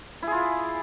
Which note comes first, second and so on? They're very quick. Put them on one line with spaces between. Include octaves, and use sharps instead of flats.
E4 G#4 F4